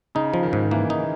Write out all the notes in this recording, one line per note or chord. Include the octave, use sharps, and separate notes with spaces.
C#3 D#4
F3
D#3
G#2
E3 A#3
D#4